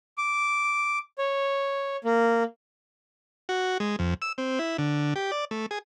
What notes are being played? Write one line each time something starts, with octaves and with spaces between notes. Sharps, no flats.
D6
C#5
A#3
F#4
G#3
F2
E6
C4
E4
D3
G4
D5
A3
G#4